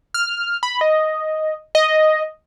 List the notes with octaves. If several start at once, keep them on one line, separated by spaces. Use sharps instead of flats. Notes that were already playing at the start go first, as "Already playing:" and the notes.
F6
B5
D#5
D#5